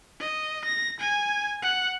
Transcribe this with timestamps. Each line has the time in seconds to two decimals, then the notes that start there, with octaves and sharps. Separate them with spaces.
0.20 D#5
0.65 A#6
1.00 G#5
1.62 F#5